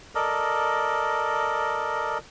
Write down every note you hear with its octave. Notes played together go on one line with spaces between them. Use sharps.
A4 A#4 D5 D#5